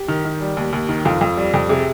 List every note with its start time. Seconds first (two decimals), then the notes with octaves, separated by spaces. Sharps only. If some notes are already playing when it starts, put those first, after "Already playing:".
Already playing: G4
0.08 D#3
0.25 D#3
0.41 G3
0.57 D#2
0.73 D#2
0.89 D#3
1.05 F2 F4
1.21 F2
1.37 G3
1.54 F2
1.69 C3 G#4